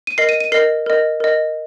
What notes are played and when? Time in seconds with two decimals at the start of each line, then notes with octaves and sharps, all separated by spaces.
0.07 D#7
0.18 A#4 D#5 C7
0.29 D#7
0.40 D#7
0.52 A#4 D#5 C7
0.86 A#4 D#5
1.20 A#4 D#5